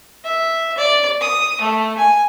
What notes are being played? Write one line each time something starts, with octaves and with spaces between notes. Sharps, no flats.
E5
D5
D#6
A3
G#5